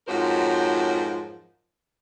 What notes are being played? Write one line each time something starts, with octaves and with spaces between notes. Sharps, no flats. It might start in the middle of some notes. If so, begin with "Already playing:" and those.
F2 G#2 F3 F#3 A#4 C5